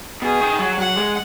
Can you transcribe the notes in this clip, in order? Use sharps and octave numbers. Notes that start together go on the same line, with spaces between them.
B2 G#4
D#3
F#3
F#3 F#5
G#3